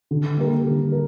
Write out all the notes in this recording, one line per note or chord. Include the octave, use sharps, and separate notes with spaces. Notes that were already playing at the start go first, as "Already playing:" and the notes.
D3
G3 A#3 G4 A#4
D3
A#4